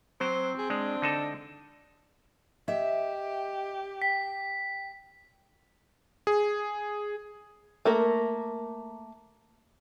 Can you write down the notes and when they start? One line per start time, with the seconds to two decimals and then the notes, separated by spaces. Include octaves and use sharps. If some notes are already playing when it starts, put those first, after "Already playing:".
0.21 F#3 C4 C5
0.59 G#4
0.70 G#3 D4
1.02 D3 D#4 A4
2.68 G4 D#5 E5
4.02 G5 B6
6.27 G#4
7.85 A3 A#3 A#4